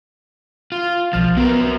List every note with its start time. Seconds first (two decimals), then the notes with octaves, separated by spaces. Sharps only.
0.72 F4
1.13 B1 F3 F6 A6
1.37 F#3 B3 A#4